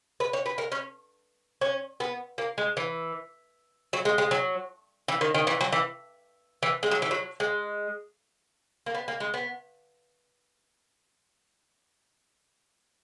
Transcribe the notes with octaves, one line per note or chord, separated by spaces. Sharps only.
B4
C#5
B4
A#4
C#4
C#4
B3
A#3
G#3
E3
F#3
G#3
G#3
F#3
E3
D#3
D#3
E3
F#3
E3
E3
G#3
F#3
E3
F#3
G#3
A#3
B3
A#3
G#3
B3